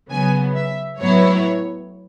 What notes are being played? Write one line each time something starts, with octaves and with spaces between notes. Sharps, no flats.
C#3 F#3 B3 G#5
E5
A2 F#3 B3 E4 C#5